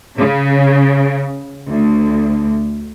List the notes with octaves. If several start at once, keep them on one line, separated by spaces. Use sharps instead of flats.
C#3
D2